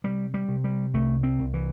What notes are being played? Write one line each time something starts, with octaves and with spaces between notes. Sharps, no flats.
C3 G3
G3
C3
G3
C2 A3
C4
C2
E3